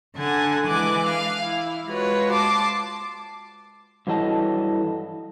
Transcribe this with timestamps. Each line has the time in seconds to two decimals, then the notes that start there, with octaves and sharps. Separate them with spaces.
0.15 D3 F#5 G#5 A5
0.66 E3 G#3 G#5 D6 F#6
1.07 F5
1.41 E4
1.87 G#3 F4 F#4 B4 C#5
2.32 A5 C6 D6
4.07 G2 E3 F#3 A4 D#5 A5